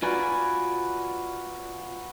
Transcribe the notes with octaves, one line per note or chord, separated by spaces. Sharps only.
F4 F#4 B4 D5 G#5 A#5